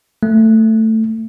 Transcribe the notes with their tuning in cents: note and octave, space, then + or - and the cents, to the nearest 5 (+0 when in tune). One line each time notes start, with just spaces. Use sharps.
A3 +10